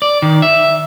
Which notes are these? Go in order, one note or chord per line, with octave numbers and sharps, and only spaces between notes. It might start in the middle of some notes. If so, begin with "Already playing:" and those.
D5
D#3
E5